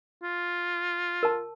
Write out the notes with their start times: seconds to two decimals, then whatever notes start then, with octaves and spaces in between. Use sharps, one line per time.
0.23 F4
1.23 A#4 A5